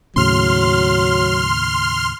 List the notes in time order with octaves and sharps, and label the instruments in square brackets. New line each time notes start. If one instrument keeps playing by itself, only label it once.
[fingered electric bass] D#2 A2 C#3 [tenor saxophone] F#3 [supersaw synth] C6 F6